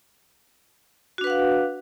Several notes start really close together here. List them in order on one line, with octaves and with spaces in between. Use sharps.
F#4 D4 B4 F#5 F5